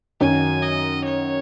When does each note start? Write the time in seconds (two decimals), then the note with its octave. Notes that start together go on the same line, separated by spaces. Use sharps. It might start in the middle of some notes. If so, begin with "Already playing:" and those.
0.20 F#2 D#3 F#3 C#4 F#4 G#5
0.63 D#5
1.05 C#5